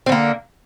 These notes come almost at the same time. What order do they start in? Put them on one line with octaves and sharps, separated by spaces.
C4 D3 A#3